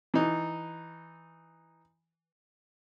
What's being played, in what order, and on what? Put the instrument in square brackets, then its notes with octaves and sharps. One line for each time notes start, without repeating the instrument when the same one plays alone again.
[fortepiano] E3 D#4